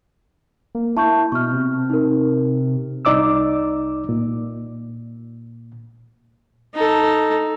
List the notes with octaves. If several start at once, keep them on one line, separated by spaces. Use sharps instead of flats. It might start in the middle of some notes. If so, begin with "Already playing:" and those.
A#3
E4 A5 C#6 G6
B2 C#6 F6
C3
D#4 A#4
C2 D#4 D5 D6 E6
A#2
D#4 A4